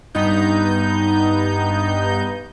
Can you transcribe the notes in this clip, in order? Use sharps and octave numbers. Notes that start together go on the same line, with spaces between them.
G2 B3 D#4 G6